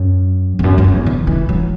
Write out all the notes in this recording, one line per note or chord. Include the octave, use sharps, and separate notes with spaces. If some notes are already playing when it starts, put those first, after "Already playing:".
Already playing: F#2
E2
F#2
F#2
E2
D#3
E3
F#3